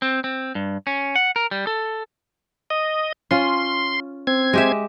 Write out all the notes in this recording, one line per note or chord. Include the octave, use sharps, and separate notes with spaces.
C4
C4
G2
C#4
F#5
A#4
G3
A4
D#5
C#4 F4 C6
C4 G#6
G#3 G4 E5